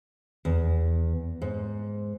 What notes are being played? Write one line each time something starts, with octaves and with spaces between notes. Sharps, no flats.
E2
G#2